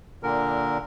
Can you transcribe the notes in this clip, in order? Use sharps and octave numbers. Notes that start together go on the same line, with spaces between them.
A#2 D3 A#4